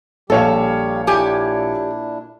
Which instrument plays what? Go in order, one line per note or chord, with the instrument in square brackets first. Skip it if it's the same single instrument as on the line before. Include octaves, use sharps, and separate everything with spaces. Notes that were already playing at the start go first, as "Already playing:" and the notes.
[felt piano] A#1 C#5 F5 [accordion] G3 G4 [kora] A4
[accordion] A#2 D4 E4 [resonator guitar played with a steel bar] G4 G#5